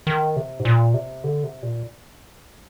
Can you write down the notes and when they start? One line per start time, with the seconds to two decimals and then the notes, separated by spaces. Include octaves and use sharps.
0.07 D#3
0.36 C3
0.60 G#2
0.65 A#2
0.94 C3
1.24 D3
1.44 C3
1.63 A#2